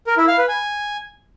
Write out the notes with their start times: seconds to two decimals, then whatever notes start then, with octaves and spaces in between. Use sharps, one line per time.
0.07 A#4
0.17 E4
0.28 F5
0.38 B4
0.48 G#5